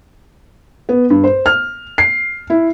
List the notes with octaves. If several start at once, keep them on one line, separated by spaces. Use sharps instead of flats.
B3
G2
C5
F6
C7
E4